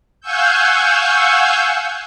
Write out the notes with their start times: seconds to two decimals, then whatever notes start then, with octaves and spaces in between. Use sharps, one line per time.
0.20 F5 F#5 G#5 C#6 E6 G6